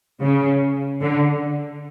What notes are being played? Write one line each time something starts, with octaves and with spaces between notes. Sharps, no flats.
C#3
D3